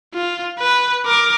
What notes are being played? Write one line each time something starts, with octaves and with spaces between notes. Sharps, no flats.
F4
B4
A#4 D6